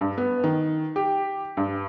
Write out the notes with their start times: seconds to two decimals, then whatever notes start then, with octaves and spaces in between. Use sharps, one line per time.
0.01 G2
0.18 B3
0.44 D#3
0.96 G4
1.57 G2